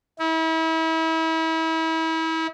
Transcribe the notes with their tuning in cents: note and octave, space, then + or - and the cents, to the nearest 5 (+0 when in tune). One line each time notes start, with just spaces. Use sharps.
E4 -35